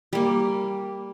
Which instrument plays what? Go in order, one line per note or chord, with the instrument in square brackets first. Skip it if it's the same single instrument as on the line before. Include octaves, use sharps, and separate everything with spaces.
[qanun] G3 A#3